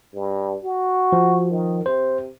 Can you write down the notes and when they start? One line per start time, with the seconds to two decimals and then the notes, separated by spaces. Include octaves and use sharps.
0.15 G2
0.64 F#4
1.12 F3
1.50 D#3
1.86 C3 C5